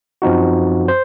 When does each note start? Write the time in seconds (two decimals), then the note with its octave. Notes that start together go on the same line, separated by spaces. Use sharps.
0.22 F#2 F3 C4 D#4 F#4
0.88 C5